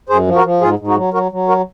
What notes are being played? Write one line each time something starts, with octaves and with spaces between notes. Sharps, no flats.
F#2 G#4 C5
F3
F#4 A#4
F3
G#2 F4 G#4
G#2
D#4 F#4
F#3
F#3 F#4 A#4
F#3
F#4 A#4